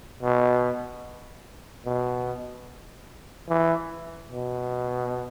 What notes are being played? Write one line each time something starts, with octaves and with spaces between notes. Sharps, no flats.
B2
B2
E3
B2